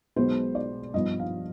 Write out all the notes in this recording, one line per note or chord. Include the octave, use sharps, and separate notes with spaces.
B1 B2 G#3 B3 C5
D5
G2 F3 B3 D#5
F5